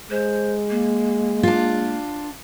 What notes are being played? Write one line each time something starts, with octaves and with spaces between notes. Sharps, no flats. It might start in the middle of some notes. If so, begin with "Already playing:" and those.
G#3 C5
A#3
D4 F4